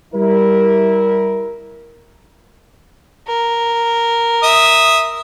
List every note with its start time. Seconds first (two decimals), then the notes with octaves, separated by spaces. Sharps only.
0.14 G3 E4 A#4
3.27 A#4
4.43 E5 D#6